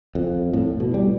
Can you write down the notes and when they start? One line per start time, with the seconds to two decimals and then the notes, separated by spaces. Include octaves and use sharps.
0.15 F2
0.53 A2
0.80 B2
0.94 G3